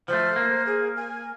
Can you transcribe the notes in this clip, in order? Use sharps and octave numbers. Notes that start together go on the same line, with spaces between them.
F3 G3 A3 C5
A#3
G#4
G#5